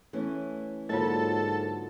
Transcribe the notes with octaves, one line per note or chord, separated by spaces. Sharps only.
E3 A3 C#4
G#2 D3 F#3 A#3 F4 A4 D#5